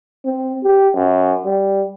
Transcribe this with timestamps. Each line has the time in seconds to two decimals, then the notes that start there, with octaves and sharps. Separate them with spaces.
0.25 C4
0.64 G4
0.94 F#2
1.46 G3